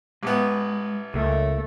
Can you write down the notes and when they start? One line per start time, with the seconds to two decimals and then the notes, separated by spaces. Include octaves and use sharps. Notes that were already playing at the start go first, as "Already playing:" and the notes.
0.23 A1 G#3 B3
1.14 C#2 C#3 A3 A#4